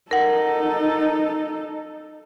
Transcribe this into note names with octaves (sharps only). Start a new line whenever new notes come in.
D#4 A4 A#4 F#5